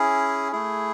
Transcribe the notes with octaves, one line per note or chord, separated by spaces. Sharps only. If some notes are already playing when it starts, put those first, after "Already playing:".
Already playing: C#4 E4 G#4
A3 E4 G#4